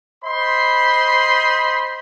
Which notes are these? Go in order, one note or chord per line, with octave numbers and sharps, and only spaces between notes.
C5 D#5 B5 C6